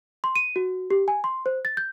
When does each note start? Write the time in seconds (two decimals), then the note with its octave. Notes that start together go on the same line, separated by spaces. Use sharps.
0.24 C6
0.36 D#7
0.56 F#4
0.90 G4
1.08 G#5
1.24 C6
1.46 C5
1.65 A6
1.77 G6